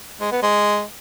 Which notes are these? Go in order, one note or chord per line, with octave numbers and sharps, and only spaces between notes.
G#3
B3
G#3